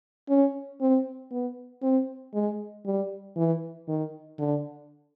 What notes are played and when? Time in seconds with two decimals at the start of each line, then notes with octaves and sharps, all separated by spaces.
0.29 C#4
0.81 C4
1.31 B3
1.83 C4
2.34 G#3
2.86 G3
3.37 E3
3.88 D#3
4.39 D3